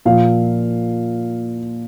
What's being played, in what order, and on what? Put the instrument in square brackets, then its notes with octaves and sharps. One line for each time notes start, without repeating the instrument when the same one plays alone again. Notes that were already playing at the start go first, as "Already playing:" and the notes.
[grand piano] A#2 F3 F5